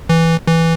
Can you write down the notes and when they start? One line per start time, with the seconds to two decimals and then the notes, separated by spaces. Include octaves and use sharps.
0.09 E3
0.47 E3